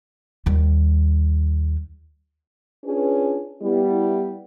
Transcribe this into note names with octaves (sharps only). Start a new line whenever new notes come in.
D#2 G3
C#4 D4 F4 G#4 B4
G3 B3 E4